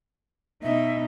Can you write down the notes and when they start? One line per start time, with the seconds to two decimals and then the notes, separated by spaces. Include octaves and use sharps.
0.63 B2 D#4 E5